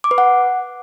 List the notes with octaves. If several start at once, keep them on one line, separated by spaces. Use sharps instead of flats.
D6
B4
F#5